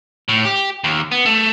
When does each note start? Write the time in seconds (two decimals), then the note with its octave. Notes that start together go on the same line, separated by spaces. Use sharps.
0.29 A2
0.45 G4
0.84 D#2
1.12 B3
1.25 A3